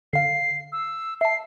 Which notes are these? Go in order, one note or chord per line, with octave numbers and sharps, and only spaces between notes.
D3 F5 C7
E6
E5 A5 C7